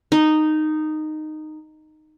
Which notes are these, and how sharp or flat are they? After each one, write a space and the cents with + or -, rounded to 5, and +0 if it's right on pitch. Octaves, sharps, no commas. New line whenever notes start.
D#4 -10